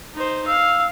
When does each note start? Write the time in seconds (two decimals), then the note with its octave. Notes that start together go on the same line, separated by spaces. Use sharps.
0.14 D#4 C5
0.47 F5 E6